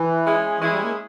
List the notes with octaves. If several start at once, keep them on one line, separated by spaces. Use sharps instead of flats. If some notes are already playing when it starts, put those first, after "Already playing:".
Already playing: E3
G#3 C#4 E4 G#4
E3 G#3 C#4 E4 G#4
G3
A#3